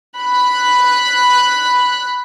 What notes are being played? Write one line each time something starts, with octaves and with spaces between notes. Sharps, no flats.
B5 F#6